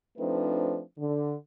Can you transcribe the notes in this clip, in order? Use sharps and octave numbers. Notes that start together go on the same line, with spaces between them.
F3 A3 C4 D4 D#4 B4
D3